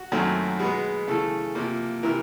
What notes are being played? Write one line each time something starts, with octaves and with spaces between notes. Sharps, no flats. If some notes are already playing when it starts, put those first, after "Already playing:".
Already playing: F#4
F#2 D#3 F#3 A3 C4
B2 G#3 B3 G#4
C#3 E3 A3 A4
C3 F3 A#3
C3 E3 A#4